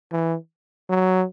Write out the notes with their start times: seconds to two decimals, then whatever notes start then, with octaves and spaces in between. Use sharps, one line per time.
0.12 E3
0.90 F#3